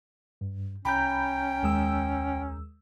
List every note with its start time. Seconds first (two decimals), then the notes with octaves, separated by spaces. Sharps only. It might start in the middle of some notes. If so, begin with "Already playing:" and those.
0.41 G2
0.85 C2 C#4 G5 A#5 B5 G6
1.63 D#2 G#3 E6